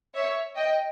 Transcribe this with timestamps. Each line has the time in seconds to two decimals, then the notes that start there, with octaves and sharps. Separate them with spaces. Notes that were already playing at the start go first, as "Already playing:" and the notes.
0.15 C#5 E5
0.55 D#5 G5